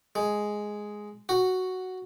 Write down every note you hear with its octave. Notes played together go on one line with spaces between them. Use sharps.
G#3
F#4